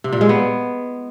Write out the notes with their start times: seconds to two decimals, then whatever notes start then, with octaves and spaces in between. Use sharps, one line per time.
0.04 C3
0.13 A#2
0.21 G#3
0.29 B3